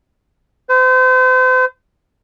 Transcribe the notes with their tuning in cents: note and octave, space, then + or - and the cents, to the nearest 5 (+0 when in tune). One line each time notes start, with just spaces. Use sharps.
C5 -40